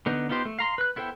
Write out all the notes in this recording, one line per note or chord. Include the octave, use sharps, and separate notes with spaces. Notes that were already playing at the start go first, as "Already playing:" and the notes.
D3 B3 D#4
B3 D#4 F4 G4 C5
A3
F5 A#5 C6
B4 F#6
B3 E4 A4 C5 G5